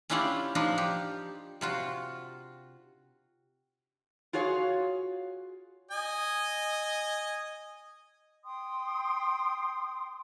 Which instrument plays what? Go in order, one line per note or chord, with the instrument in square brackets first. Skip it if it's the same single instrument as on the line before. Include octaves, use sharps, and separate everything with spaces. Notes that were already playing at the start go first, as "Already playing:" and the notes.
[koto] C#4 D4 E4 F4 G4 D5
F3 D4 D#4 F4
G4
C3 F4 F#4
[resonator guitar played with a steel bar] F4 F#4 G#4 C#5 F5
[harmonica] D#5 G#5
[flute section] G5 C6 D#6